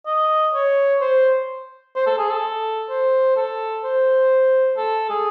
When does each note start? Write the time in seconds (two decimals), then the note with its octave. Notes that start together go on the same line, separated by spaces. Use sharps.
0.06 D#5
0.53 C#5
1.01 C5
1.95 C5
2.07 A4
2.18 G#4
2.30 A4
2.89 C5
3.36 A4
3.84 C5
4.77 A4
5.10 G#4